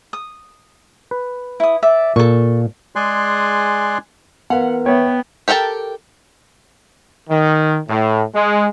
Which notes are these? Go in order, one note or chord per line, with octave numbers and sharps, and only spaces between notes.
D#6
B4
E4 D#6
D5 E5
A#2 A4 C#6
G#3 G#4 D5 G#5 C6 F#6
E3 B3 A#4 B4 F5 F#5
B3 C#5 E5 G5
G4 A4 A#4 G5 A5
D#3
A2
G#3